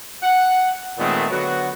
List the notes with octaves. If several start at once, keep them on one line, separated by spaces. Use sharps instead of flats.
F#5
A#2 D#3 G#3 A3 B3 C4
D3 F#3 B3 F#4